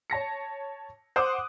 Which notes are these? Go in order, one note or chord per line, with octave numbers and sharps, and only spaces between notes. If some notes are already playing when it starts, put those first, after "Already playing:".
C#5 A5 A#6 C#7
C5 F#5 C6 D6 D#6 F#6